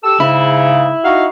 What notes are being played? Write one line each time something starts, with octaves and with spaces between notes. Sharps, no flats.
G4 A4 E6
G#2 C#3 E4
D#4 F#4 F5